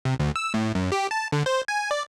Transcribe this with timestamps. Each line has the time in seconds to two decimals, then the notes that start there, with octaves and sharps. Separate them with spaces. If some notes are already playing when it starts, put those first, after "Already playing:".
0.05 C3
0.19 D2
0.36 E6
0.54 A2
0.75 F#2
0.92 G4
1.11 A5
1.32 D3
1.46 C5
1.68 G#5
1.91 D5